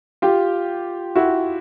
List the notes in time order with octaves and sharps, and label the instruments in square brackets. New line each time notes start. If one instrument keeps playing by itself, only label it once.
[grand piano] F4 G4
E4 F#4